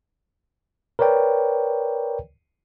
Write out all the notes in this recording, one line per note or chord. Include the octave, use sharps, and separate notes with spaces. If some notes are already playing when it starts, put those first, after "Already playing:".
A#4 B4 C#5 D5 G5